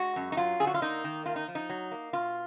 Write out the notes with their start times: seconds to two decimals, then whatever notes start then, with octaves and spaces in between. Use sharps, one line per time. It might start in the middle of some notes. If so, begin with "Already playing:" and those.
Already playing: G#3 F#4
0.16 F#2
0.32 D#4
0.37 F#3 F4
0.60 D3 G#4
0.67 F#4
0.74 F4
0.82 A#3 D#4
1.04 D#3
1.26 A#3 F4
1.36 D#4
1.48 F3
1.55 D#4
1.69 F#3
1.91 A#3
2.13 B2 F4